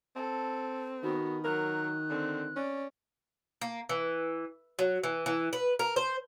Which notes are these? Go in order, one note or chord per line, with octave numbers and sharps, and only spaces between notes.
C4 A4
D#3 B3 F#4
F#3 A#4 F#6
D3 C4
C#4 D5
A#3
E3
F#3
E3
E3
B4
A#4
C5